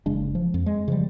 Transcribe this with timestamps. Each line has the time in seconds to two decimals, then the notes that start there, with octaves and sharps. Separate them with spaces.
0.06 F#1 C#3 G#3 D4
0.35 F3
0.54 F2
0.66 G#3
0.88 C#3 F3 G3